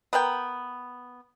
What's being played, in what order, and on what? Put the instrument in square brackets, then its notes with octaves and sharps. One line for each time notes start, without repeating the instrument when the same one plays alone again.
[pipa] B3 A#4 G5